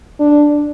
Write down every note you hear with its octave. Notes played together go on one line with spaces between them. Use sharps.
D4